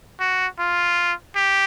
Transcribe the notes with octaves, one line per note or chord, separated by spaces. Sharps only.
F#4
F4
G4